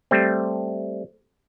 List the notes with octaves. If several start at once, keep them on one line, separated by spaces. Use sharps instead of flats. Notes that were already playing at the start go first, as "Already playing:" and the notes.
G3 A3 C4